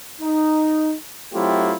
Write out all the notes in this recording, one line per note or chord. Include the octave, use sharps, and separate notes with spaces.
D#4
F#3 A3 C4 E4 F4 G4